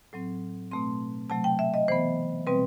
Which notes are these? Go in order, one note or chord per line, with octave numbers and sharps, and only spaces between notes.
A2 F#3 C4
B2 A3 C4 C6
C3 F#3 A3 A5
G5
E5
D#5
E3 B3 C5
B2 G3 C4 B4